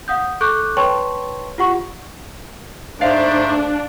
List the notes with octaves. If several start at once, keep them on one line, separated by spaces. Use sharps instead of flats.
F5 F#5 D#6 G6
A4 C#6 D6 F#6 G6
B4 C#5 G5 A5 C6 C#6
F4 G4 F#5 C#6
G#2 A3 D4 C5 D5 F5